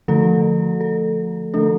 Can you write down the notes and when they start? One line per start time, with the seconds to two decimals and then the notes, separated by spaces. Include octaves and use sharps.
0.08 D3 F3 A3 A4
0.81 A4
1.54 D3 F3 A3 D4 A4